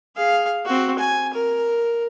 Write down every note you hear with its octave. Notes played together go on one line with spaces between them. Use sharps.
G#4 F5
C4 F#4
G#5
A#4